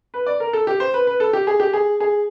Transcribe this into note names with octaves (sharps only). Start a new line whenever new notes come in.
B4
D5
A#4
A4
G4
C5
B4
B4
A4
G4
G#4
G4
G#4
G#4